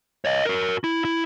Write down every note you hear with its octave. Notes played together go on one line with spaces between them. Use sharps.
C#5 D#5
F#4 A#4
E4
E4